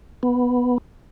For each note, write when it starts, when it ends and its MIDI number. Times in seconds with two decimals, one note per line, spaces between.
0.23 0.78 59